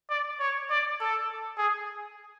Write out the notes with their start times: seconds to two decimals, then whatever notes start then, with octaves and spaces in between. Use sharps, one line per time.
0.10 D5
0.40 C#5
0.70 D5
1.00 A4
1.58 G#4